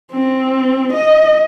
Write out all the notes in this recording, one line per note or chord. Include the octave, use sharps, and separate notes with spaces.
C4
D#5